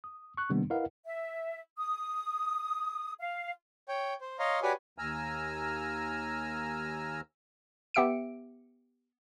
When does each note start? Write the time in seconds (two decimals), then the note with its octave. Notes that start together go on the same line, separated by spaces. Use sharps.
0.04 D#6
0.37 C#6 F#6
0.50 C3 D#3 G3 A#3 B3 D4
0.70 E4 A#4 B4 D#5 F5 F#5
1.06 E5
1.78 D#6
3.20 F5
3.89 C#5 G5
4.21 C5
4.39 C#5 D#5 F5 A#5 C6
4.63 F#4 G4 B4 C#5 D5 G#5
4.98 D#2 G#5 A#5 E6 F6
7.94 B3 G4 E5 E6 C#7 D7